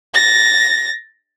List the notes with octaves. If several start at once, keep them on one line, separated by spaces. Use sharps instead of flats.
A6 A#6